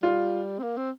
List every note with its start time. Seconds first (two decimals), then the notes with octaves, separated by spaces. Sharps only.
0.03 G3 F4
0.59 C4
0.63 A#3
0.77 C4